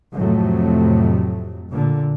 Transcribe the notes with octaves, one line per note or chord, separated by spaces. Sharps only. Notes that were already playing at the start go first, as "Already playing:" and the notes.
F2 A2 C3 F#3 A3
A#2 D3